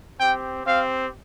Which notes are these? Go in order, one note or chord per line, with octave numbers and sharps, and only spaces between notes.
C4 G4 G5
C4 G4 F5